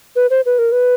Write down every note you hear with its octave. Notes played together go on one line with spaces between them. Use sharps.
B4
C5
B4
A#4
B4